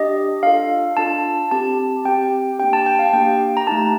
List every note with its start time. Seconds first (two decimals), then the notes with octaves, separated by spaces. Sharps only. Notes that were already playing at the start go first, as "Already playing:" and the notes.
Already playing: D4 G4 D#5
0.43 D4 F4 A4 F5
0.97 D4 F4 A4 A5
1.51 C4 G4 A5
2.05 C4 G4 G5
2.59 A#3 D4 G4 G5
2.73 A5
2.86 G5
2.99 F5
3.13 A#3 D4 G4 G5
3.57 A#5
3.67 A3 D#4 G4 A5